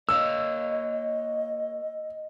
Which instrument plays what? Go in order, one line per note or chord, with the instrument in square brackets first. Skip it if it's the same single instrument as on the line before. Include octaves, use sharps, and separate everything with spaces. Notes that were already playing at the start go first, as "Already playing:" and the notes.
[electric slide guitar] A#3 C#5 F5 [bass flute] D#5 [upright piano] E6